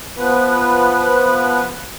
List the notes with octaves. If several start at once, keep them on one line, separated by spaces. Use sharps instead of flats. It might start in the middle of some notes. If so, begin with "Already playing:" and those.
F3 B3 B4